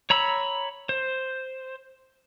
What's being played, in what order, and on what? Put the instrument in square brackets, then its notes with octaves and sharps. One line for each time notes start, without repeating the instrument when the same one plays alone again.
[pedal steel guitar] C#5 A#5 B5 E6
C5